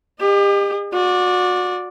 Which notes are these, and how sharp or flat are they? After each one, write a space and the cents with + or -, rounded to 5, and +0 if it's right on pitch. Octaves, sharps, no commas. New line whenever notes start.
G4 +35 D#5 -30
F#4 -30 D5 +0